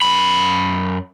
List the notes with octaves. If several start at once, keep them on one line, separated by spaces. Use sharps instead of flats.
F#2 B5